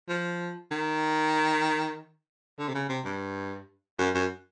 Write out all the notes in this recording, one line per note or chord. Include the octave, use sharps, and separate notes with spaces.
F3
D#3
D3
C3
C#3
C3
G2
F#2
F#2